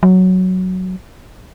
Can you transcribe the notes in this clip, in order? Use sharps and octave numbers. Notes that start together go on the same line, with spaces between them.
F#3